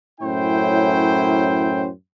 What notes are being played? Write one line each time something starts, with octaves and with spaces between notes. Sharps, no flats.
F#2 A2 C#4 E4 C5 G5